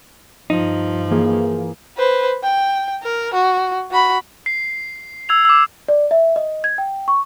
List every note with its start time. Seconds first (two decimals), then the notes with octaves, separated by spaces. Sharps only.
0.50 G2 F3 D#4
1.10 E3 A#3 G#4
1.97 B4 C5
2.43 G5
3.03 A#4
3.33 F#4
3.91 F#4 B5
4.46 C7
5.29 E6 G#6 F7
5.45 D6 E6
5.88 D5
6.11 E5
6.36 D#5
6.64 G#6
6.78 G5
7.08 C#6